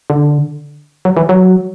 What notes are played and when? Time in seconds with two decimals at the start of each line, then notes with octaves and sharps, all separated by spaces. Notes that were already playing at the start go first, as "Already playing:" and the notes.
0.10 D3
1.05 F#3
1.17 E3
1.29 F#3